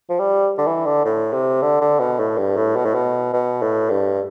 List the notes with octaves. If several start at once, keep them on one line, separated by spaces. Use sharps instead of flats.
F3
G3
D3
E3
D3
A2
C3
D3
D3
B2
A2
G2
A2
B2
A2
B2
B2
A2
G2